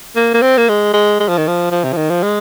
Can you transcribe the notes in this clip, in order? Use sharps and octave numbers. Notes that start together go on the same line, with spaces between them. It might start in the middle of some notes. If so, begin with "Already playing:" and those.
A#3
A#3
C4
A#3
G#3
G#3
G#3
F3
D#3
F3
F3
C3
F3
D#3
F3
G#3